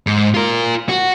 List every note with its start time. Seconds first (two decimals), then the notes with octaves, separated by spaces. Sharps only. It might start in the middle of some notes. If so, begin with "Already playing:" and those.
0.07 G#2
0.34 F4 A#4
0.89 F#4